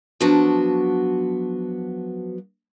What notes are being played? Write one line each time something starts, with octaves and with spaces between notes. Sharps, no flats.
F3 F#3 B3 D4 F#4